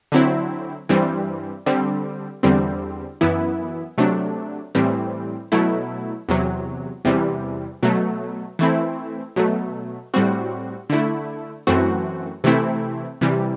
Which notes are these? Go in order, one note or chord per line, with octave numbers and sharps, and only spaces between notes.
D3 F#3 C4 E4
G2 E3 G3 C4
D3 G3 C4
E2 D3 G3 C4
F#2 E3 B3 E4
C3 F#3 A3 D4
A2 E3 G3 C4
B2 F#3 A3 E4
E2 C3 F#3
E2 C3 E3 G3
B2 F#3 A3
E3 A3 C4 E4
B2 F#3 A3
A2 G3 C4 F#4
D3 A3 E4
F#2 E3 A3 C4 F#4
C3 E3 A3 C4 E4
C3 E3 G3